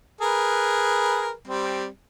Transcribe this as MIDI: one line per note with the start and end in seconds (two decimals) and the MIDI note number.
0.21 1.32 68
0.21 1.32 70
0.21 1.32 71
1.48 1.86 55
1.48 1.86 60